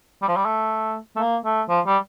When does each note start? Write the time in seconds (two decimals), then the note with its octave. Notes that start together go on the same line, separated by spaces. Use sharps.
0.22 G3
0.28 F3
0.36 G3
0.45 A3
1.16 A3
1.19 A#3
1.45 A3
1.69 F3
1.86 G3